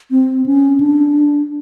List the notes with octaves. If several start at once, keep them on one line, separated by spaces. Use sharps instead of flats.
C4
C#4
D4